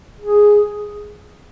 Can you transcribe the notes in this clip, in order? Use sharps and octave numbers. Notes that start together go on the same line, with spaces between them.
G#4